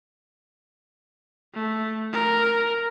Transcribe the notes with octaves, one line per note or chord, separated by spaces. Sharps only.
A3
A#4